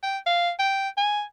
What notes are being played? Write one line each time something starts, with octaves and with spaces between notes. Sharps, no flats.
G5
F5
G5
G#5